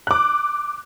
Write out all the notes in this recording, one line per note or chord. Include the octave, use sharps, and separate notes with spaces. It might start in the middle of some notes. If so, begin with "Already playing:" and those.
D6 F#6